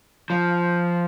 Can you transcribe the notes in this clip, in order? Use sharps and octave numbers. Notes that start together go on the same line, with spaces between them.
F3